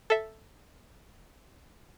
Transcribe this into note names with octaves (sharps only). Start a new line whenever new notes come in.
A4 E5